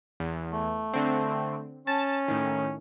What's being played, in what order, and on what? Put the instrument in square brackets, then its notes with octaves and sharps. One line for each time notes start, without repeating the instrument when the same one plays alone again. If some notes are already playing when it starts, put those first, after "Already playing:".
[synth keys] E2
[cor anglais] A3
[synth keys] D3 C4
[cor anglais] C#4 [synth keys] A5 A6
[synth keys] A2 D#3